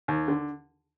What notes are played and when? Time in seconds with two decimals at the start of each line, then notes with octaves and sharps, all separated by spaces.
0.08 D#2
0.28 D3